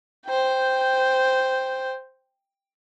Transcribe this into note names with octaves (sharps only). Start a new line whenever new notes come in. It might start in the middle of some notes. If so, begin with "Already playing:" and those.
C5 G5